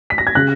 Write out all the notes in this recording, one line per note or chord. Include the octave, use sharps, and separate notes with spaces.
B6
A#6
G#6
C#3 F#6